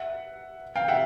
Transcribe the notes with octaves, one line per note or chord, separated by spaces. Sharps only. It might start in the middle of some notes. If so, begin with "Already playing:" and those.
Already playing: E5 F#5
F5 G5
E5 F#5